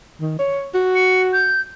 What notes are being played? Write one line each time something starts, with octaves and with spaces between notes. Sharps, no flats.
D#3
C#5
F#4
C#7
G6